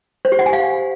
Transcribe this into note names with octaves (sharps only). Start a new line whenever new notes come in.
C5
G4
F#5
G#5
F5